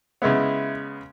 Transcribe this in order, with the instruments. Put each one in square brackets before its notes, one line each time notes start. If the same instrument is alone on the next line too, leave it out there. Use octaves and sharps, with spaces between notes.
[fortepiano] C#3 G#3 B3 E4